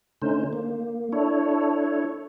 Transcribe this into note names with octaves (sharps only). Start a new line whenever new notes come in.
D3 A3 C#4 D#4 C5
A#3
D4 E4 A4 C#5